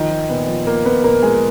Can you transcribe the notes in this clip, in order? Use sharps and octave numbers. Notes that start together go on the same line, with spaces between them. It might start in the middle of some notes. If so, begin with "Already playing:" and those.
Already playing: D#3 F3 D#4
F3
A#2 B3
F3
F3 A#3 A#4
F3 B3 B4
A#2 A#3 A#4
F3 G#3 G#4